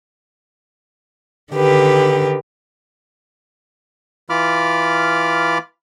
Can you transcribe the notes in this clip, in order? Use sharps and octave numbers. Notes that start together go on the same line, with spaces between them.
D3 D#3 G4 B4
E3 F4 B5 D6 F6